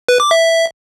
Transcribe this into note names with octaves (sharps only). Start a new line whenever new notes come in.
B4
D6
E5